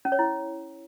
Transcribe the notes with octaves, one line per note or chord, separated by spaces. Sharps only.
C#4
C#5
E4